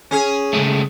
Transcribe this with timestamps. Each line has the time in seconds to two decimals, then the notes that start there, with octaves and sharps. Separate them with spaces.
0.11 C#4 G#4
0.53 C#3 G#3 A3